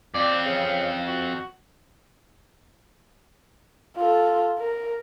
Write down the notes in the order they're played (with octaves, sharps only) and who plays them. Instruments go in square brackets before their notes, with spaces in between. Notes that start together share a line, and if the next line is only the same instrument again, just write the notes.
[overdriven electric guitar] F2 C4 [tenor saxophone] D5
[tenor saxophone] C#3
F#4
[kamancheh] F4 A4
A#4